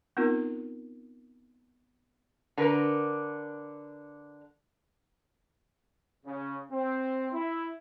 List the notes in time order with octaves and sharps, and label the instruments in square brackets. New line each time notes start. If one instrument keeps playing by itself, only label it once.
[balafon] B3 C4 D#4 F4 A#4
[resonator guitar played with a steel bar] D3 D4 A#4 B4
[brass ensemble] C#3
C4
E4